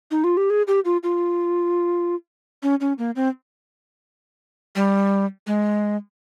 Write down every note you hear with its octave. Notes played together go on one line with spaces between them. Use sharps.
D#4
F4
G4
G#4
G4
F4
F4
C#4
C#4
A#3
C4
G3
G#3